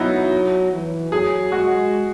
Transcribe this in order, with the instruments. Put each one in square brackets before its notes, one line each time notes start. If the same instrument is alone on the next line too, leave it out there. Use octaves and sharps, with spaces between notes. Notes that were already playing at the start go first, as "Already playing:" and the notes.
Already playing: [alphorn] F#3 [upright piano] B3 D#4 E4 F#4
[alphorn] E3
[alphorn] F#3 [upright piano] G#4
[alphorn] G#3 [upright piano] F#4